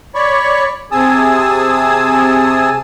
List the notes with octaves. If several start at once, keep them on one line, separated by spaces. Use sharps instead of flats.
C#5 D5 B5 C#6
C3 G#4 G#5 A5 D#6 E6